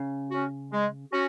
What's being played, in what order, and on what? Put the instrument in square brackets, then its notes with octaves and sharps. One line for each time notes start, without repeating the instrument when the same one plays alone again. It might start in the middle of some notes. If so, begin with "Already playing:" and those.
Already playing: [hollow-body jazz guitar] C#3
[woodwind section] C#4 F#4
G#3
C#4 F#4